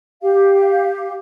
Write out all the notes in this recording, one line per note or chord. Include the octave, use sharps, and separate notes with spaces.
G4 F5